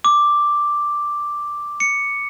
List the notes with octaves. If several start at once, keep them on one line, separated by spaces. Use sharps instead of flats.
D6
C#7